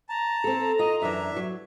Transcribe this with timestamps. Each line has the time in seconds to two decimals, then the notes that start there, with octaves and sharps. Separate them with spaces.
0.09 A5 A#5
0.44 C4 A4
0.79 F4 D#5
1.02 F#2 E3 D4 E5
1.36 F#3